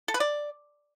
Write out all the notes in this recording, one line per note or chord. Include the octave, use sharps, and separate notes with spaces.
A4
B4
D5